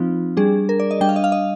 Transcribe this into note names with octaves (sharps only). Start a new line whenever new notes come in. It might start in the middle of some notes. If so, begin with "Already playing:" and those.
Already playing: F3 C4 D#4 F4
G3 D4 G#4
A#4
D5
D#5
G3 D4 G5
F5
D#5
F5
D#5